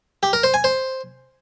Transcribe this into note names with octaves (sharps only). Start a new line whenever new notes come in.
G4
A#4
C5
G#5
C5